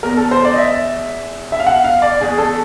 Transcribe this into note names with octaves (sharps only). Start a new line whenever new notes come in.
E2 B2 A#4
A4
C5
D5
D#5
E5
E5
F5
F#5
F5
D5
E2 B2 G#4
A4